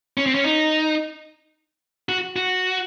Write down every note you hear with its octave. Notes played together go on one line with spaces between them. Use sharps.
C#4
C4
C#4
D#4
F#4
F#4